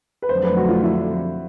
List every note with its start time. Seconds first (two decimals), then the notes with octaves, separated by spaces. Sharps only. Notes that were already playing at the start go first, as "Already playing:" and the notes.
0.22 B4
0.29 F2 D3 F#3 A3 C5
0.44 B4
0.57 F#4
0.69 F4
0.83 E4